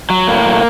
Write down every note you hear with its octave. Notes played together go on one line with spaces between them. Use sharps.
F#3
A2 A#3
F#3